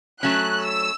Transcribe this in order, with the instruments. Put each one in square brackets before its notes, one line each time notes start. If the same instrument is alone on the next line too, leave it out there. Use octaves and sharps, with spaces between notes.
[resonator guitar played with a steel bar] F#3 A3 C#4 [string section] F#6
[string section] E6